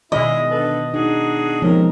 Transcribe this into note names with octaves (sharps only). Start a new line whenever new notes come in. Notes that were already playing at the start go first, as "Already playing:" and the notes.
B2 D#3 G#3 E4 D#5
D3 A4 B4
D4 D#4 F#4 G#4
C3 F3 G#3 B3 C#4 D#4 A#4